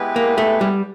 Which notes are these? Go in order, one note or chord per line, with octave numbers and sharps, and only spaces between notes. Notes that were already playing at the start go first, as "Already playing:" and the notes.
Already playing: G#3 B3 E4 G4 B4
A#3
A3
G3